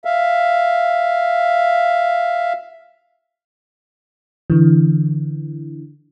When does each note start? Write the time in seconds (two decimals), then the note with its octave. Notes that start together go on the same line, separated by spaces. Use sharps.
0.05 E5 F5
4.50 D3 E3